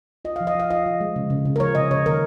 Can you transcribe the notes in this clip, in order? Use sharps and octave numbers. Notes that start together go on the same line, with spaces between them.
F4 D#5
F3 F5
D#5
F3 F5
F4 D#5
F3
G#3
C#3
C#3
C#3
A#4
F3 C#5
C#3 D#5
C#3 C#5
D#3 A#4